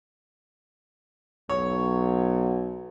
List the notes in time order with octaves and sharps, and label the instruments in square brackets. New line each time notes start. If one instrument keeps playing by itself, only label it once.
[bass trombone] B1 [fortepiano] C#5